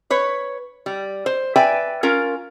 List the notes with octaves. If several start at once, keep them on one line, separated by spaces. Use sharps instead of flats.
B4 C#5
G3
C5
B4 D5 E5 G5 G#5
C#4 F4 A#4